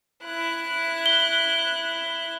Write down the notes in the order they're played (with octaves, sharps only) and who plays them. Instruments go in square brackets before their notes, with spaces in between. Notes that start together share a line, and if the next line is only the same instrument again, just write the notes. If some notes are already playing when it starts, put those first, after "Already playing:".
[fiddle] E4 F#6
[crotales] G7